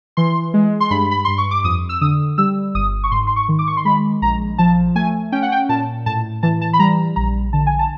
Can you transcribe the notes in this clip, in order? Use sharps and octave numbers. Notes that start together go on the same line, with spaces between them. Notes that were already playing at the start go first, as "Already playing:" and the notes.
E3 C6
G#3
C6
G2 B5
B5
G2 C6
C#6
D6
F2 D#6
E6
D3 D#6
G3 E6
G1 D#6
C#6
G#2 C6
C6
C#6
D#3
D6
C#6
C6
G#3 B5
A#1 A#5
F3 A5
A3 G#5
C#4 G5
F#5
G5
A#2 A5
A2 A5
E3 A5
A5
B5
G3 A#5
A#1 A#5
D3 A5
G#5
A5